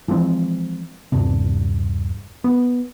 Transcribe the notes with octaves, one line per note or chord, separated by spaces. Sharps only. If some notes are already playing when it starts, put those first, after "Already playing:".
E3 F3 G#3 C4
D#1 G2 C3
B3